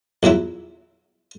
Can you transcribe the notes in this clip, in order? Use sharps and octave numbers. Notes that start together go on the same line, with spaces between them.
E2 A#2 F#3 E4